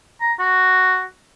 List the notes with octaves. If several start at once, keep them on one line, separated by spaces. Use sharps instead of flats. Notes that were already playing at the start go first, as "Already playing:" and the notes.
A#5
F#4